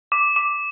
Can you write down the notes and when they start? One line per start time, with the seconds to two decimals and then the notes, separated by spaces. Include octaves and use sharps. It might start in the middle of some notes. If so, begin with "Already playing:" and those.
0.12 D6
0.36 D6